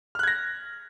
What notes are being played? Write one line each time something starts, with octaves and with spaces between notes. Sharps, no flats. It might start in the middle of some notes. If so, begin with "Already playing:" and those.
F6 F#6 G#6 A#6